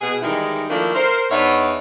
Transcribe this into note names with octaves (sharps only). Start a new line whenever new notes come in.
B2 G#4
D#3 E3 G3 G#3 D#4 E4
D#3 F3 A3 A#3 D4 E4
A#4 C5
E2 B3 D4 D#4 C#5 E5